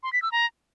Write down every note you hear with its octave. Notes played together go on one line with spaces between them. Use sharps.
C6
B6
E6
A#5